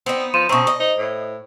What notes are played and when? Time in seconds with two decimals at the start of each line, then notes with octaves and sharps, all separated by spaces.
0.06 B3 C4 D#4
0.34 F3 C6 D#7 E7
0.49 B2 C4 C#4 A#5 C#6 D#6
0.67 D#5
0.80 D#4 C5
0.98 A2